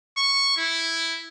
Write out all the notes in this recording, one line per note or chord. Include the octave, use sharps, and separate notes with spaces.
C#6
E4